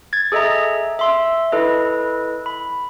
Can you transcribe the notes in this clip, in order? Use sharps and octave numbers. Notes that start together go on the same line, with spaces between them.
G#6 A6
G#4 A4 D#5 E5 A#5
E5 C6 E6
E4 A4 B4 D#5
B5